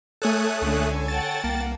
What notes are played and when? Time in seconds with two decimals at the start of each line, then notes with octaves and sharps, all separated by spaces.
0.22 A3 A4 C#5 G#5 D#6 F#6
0.62 C#2 D3 C#4
1.08 F#5 G5 A5 A6
1.44 C2 A#3